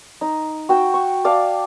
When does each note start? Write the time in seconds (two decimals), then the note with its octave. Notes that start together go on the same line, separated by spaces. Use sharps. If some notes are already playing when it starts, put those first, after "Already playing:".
0.21 D#4
0.69 F#4 G5 E6
0.94 C#6
1.25 D5 E5 F5 A5